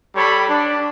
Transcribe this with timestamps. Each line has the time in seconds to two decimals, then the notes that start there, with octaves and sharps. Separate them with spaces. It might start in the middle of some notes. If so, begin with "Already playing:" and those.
0.16 G3 A4 C#5 B5
0.49 D4